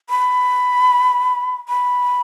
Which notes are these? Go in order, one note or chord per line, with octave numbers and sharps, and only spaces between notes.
B5
B5